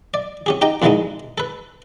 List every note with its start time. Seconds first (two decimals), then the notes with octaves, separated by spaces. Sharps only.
0.14 D5
0.46 C#4 G4 G#4
0.62 D#4 G4 G5 A#5
0.82 F2 D3 E3 G3 G#3 D#4
1.38 A4 B4